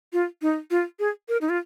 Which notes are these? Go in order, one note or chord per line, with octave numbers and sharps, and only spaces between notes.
F4
D#4
F4
G#4
A#4
D#4
F4